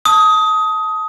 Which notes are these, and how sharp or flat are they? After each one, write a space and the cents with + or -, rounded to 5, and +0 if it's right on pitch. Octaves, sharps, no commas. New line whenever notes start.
A5 +5 D#6 +20